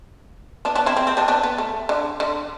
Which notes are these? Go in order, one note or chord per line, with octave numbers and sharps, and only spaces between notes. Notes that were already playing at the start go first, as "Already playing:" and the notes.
B3 D4
B3 D4
C4 E4
C4
C4
B3 D4
B3 D4
B3
A3
D3
D3